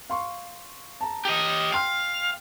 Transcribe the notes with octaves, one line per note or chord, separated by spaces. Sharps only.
F5 C6 C#6
A5 A#5
G4 D#5
F5 G5 C6 F6